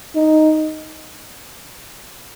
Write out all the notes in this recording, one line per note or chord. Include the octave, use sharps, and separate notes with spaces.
D#4